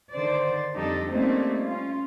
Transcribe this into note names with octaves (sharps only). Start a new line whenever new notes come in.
D3 D#3 C5 D5
F2 G3 D4 D#4 G4 A4
G3 A3 A#3 C4 C#4 D#4
C#4 F4